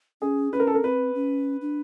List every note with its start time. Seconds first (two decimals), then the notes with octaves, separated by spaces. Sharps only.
0.22 C#4 G#4
0.53 C#4 B4
0.60 A#4
0.67 A4
0.75 A#4
0.83 C4 B4
1.15 C#4
1.61 D4